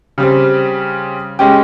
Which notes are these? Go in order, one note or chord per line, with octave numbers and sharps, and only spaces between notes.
C#3 G3 C4
G#3 C#4 G4